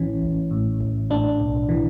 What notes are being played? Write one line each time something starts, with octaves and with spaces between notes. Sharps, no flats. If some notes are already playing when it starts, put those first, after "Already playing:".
Already playing: A1 A2 E3 C#4
A1
A2
A1
A2 D4
B1
E3